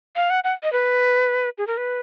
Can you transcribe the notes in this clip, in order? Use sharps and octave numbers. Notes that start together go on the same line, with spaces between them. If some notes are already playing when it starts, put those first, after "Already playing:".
F5
F#5
F#5
D#5
B4
G#4
A#4
B4